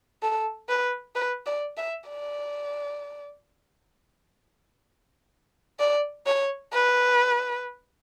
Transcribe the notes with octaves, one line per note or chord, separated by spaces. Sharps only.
A4
B4
B4
D5
E5
D5
D5
C#5
B4